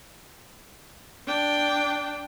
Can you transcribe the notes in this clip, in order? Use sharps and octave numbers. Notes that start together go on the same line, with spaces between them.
D4 G5